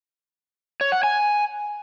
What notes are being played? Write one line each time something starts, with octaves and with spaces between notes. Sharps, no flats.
C#5
F#5
G#5